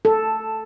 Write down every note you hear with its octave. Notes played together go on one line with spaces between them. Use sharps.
A4